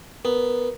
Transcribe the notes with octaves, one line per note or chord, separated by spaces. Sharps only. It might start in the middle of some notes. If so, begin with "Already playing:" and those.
B3 A#4